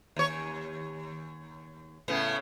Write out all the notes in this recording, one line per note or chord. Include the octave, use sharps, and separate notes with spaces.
D#2 C#5
A2 C#3 B3